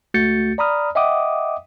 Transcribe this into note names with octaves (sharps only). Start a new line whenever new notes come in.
C#2 A3 F#4 G6 A6 C#7
D5 A#5 B5 D#6 F6
D#5 E5 F#5 G5 D6 D#6